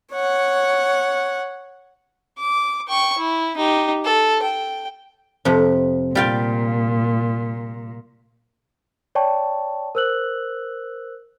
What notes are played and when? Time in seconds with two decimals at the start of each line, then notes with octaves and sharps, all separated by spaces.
0.13 C#5 F#5
2.39 D6
2.88 G5 C#6
3.18 E4
3.57 D#4 G4
4.05 A4
4.42 G5
5.45 F2 C3
6.15 A#2 G3 F4 G5
9.15 C#5 D5 G5 A5 C#6
9.95 A#4 C5 E6 F#6 F#7